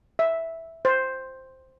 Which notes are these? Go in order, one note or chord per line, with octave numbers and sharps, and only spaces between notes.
E5
C5